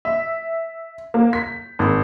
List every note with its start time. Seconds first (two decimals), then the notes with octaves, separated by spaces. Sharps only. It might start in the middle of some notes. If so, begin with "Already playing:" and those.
0.05 E5
1.14 A#3
1.33 B6
1.79 G#1